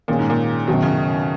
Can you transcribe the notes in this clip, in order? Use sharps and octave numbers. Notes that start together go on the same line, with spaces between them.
A#2 D#3 G#3 C#4 F4 G#4
G#2
A#2
F#2 B2 D#3 F#3
C#3